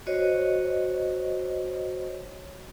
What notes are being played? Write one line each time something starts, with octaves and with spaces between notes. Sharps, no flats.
F#4 C5 C#5 D#5